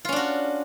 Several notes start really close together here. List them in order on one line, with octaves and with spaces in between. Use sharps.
F4 C#4 D4 F#4